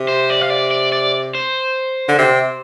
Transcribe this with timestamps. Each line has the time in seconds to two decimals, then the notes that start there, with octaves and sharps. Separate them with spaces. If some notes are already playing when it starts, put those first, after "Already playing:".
Already playing: C3
0.08 C5
0.30 D5
0.41 F5
0.50 D5
0.71 D5
0.92 D5
1.35 C5
2.08 D3
2.18 C3